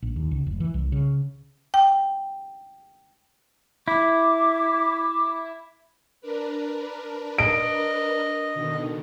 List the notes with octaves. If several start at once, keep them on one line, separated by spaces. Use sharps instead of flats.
A#1
D#2
C#2
F1
E3
C2
C#3
G5
E4 D6
D4 A#4 B4
D#5 D7
B2 D3 D#3